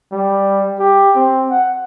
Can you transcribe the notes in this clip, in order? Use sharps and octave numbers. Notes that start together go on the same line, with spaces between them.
G3
G4
C4
F#5